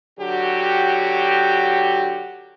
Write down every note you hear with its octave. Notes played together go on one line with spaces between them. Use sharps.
D3 F#3 F#4 G4